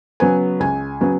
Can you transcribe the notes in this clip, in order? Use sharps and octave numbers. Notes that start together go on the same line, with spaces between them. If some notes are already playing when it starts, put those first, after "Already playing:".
C#3 F#3 B3 G#5
C#2 G#5
C#3 F#3 B3